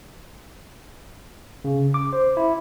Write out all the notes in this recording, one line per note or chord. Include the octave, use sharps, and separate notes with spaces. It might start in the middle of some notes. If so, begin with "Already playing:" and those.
C#3
D6
C5
E4